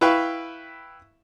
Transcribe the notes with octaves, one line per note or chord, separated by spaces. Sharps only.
E4 B4 E5 F5 G5 C#6